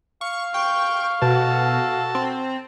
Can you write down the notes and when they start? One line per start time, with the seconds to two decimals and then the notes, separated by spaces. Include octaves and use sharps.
0.21 F5 C#6
0.54 G5 C#6
1.22 B2 F#4 A4 A5
2.15 C4